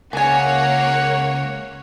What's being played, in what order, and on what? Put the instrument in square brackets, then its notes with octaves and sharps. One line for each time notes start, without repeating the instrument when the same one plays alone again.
[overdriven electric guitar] C#2 [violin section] A#3 C#4 C#5 [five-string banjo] G#4 G#5 [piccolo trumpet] F#5